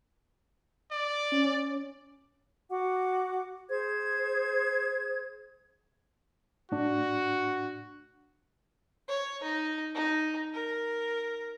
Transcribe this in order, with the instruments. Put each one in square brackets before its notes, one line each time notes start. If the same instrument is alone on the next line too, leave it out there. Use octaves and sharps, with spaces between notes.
[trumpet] D5
[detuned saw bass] C#4
[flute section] F#4 F#5 D6
G#4 C5 G#6
[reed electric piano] A2 D4 [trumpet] F#4
[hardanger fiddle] C#5
D#4
D#4
A#4